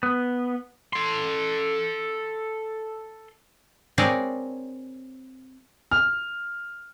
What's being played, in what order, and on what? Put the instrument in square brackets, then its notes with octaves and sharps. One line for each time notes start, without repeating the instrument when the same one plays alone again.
[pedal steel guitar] B3
[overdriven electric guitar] A4 C6
[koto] C4 D4 G#4 A#4 C#5 D5
[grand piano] F6